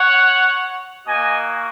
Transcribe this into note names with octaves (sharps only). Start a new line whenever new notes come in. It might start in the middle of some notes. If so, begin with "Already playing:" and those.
Already playing: C#5 F#5
A#3 F#4 D#5 G#5